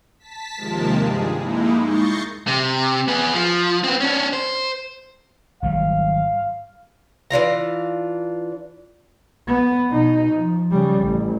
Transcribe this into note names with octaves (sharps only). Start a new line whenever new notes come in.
A5 B6
D#2 C3 F3 G#3 A#4 A5
G2 G#4
G#3 A#3 D#4 E4
C#6 G6 A6 A#6 C7 C#7
C3
B3 G#4
F3
B3 C4
C#4 D4
C5
G#1 F#3 G3 F5
E3 D4 F4 A#5
B3
B2 D#4
F3
C#3 G3
A1